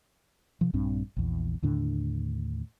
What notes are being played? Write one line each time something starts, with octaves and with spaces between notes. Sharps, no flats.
C3 F3
A#1 G2 C4 D4
A#1 E2
D#2 A2 D3 D4